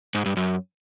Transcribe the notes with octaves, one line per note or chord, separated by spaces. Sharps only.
G#2
G2
F#2